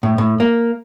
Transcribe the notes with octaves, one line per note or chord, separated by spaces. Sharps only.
A2
A2
A#3